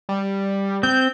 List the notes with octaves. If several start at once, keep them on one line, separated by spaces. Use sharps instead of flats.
G3
C4 G6